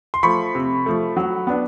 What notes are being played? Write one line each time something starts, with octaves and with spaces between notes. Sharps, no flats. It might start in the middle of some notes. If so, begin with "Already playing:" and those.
C6
F3 A3 B5 C#6
C3
F3 A3
F#3
B3 D4